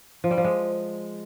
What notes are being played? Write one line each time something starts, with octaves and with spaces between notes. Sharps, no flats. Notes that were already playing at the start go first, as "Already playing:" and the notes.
F3
G3
F3
G#3